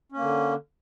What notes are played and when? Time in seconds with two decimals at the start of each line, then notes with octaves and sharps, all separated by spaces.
0.12 C#4
0.17 A#3
0.21 D3